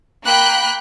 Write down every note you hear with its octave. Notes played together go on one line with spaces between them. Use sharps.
A#3 G5 B5 F#6